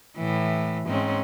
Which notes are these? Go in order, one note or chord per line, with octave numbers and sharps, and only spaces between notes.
A2 E3
G#2 C4 C#4